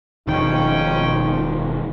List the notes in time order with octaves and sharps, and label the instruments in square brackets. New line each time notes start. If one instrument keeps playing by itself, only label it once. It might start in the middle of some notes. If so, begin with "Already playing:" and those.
[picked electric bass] E1 D#3 [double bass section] B2 F3 [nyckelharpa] C#4 G5 [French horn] D#4